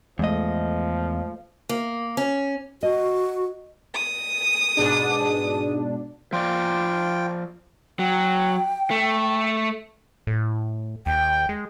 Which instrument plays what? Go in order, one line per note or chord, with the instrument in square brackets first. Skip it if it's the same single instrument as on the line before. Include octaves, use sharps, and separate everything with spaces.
[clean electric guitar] E2 D#5 [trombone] F3 [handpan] G#3 A3
[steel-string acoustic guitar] A#3
C#4
[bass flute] F#4 [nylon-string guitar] D#5
[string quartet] D#6
[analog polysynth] G#2 B2 D4 [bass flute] G#4
[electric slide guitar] F3 D5 [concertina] F4 G5
[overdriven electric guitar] F#3 [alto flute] G5
[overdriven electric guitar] A3
[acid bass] A2
[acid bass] D#2 [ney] G5
[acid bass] G#3